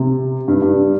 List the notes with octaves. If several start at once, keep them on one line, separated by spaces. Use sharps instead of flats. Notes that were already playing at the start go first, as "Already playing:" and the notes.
Already playing: C3
G2
G2